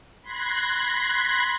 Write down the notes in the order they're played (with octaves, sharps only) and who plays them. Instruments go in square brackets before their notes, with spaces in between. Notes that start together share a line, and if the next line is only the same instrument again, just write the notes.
[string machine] B5 C6 F#6 G#6 A#6 B6